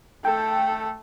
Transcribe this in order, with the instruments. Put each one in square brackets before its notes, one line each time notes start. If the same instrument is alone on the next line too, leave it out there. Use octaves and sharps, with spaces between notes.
[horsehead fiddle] A3 A4 [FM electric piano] G5